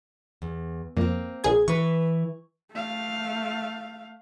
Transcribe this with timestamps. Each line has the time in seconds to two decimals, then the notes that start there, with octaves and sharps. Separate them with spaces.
0.42 E2
0.97 F2 A#3 C4
1.44 A#1 G#4 G#6
1.68 E3 B4 C#6
2.72 A3 F5